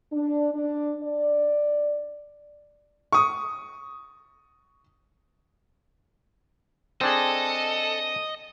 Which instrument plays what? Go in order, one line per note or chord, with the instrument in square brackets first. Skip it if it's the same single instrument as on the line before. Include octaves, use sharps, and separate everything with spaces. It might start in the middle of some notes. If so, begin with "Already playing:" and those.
[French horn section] D4
D4
D5
[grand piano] C#6 D#6
[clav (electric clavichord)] C4 D4 G#4 [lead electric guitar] A4 [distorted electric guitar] D#5